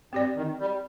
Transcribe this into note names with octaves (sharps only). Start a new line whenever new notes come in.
G2 C4 G4 D5
D#3
G3